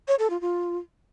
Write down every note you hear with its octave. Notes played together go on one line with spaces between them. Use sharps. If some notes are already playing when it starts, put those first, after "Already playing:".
C#5
A4
F4
F4